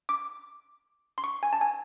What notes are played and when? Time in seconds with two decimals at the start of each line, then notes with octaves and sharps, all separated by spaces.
0.09 D6
1.18 C6
1.24 C#6
1.43 G#5
1.53 A5
1.61 G#5